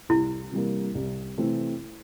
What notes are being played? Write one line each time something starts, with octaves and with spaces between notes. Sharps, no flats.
C2 E4
C3 E3 G3 A#3
C2
C3 E3 A3 C4